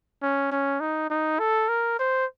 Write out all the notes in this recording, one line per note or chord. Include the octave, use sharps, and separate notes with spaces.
C#4
C#4
D#4
D#4
A4
A#4
C5